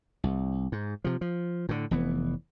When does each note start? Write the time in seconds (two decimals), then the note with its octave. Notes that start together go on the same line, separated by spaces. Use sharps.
0.24 C2
0.72 G#2
1.04 C3 F3
1.21 F3
1.69 A2 D3
1.91 F1 E3 B3